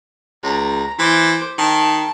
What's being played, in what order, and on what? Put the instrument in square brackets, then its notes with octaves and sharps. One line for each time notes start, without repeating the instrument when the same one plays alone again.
[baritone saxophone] C#2 [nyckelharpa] A#5
[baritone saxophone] E3 [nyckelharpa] C5 D6
[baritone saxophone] D#3 [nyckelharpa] A5